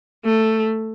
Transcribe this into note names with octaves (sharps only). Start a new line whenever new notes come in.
A3